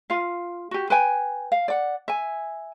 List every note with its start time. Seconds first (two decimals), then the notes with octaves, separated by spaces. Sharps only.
0.10 F4 F5
0.71 F#4 G4
0.90 B4 G5 G#5
1.52 F5
1.68 D5 F#5
2.08 E5 G#5